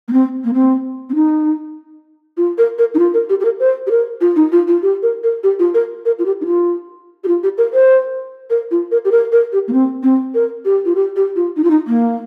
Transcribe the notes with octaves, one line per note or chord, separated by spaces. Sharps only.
A#3
C4
A#3
C4
C4
D#4
F4
A#4
A#4
D#4
F4
A#4
G4
G4
A#4
C5
G4
A#4
F4
D#4
F4
F4
G4
A#4
A#4
G4
F4
A#4
A#4
F4
G4
D#4
F4
G4
F4
G4
A#4
C5
A#4
F4
A#4
G4
A#4
A#4
G4
A#3
C4
C4
A#4
G4
F4
G4
G4
F4
D#4
F4
D#4
A#3